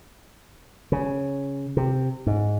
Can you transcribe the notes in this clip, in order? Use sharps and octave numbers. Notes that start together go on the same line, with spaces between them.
C#3
C3
G#2